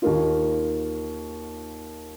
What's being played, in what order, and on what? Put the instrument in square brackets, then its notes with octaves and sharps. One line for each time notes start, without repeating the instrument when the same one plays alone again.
[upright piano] D#2 D#3 A#3 F4